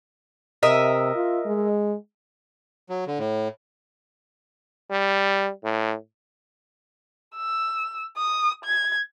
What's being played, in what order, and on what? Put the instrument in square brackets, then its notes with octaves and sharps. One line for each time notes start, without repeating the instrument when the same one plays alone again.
[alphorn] C3 [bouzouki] A#4 D#5 E5
[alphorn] F4
G#3
[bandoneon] F#3
D3
A2
[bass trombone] G3
A2
[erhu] E6
D#6
G#6